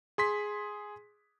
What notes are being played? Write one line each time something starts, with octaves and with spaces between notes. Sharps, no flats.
G#4 C6 B6